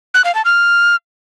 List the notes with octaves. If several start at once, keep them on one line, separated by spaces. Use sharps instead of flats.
F#6
F5
A5
F6